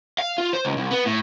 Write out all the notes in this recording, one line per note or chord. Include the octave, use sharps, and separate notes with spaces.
F5
F4
C5
C#2
C2
B3
A2